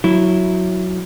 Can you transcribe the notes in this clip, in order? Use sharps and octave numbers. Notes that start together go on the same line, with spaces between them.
F#3 E4